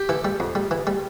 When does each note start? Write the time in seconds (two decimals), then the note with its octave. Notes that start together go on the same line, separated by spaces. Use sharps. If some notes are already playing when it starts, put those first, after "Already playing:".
Already playing: G4
0.09 E3 A4
0.25 G3
0.40 F2
0.55 G3
0.71 E3
0.87 G3